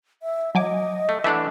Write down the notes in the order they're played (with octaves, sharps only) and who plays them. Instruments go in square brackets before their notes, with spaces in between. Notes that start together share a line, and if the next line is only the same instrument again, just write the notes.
[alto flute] E5
[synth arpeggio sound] F#3 G#5 D6 [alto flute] D#5
[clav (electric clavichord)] A3
[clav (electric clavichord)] E3 A3 D4 [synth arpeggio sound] E5 F#5